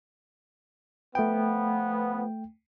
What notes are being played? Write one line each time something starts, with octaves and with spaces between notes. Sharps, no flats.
F3 A3 B3 G5